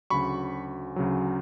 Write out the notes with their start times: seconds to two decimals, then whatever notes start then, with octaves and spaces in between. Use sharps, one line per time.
0.10 D2 C#3 F#3 B5 C#6
0.96 D2 C#3 F#3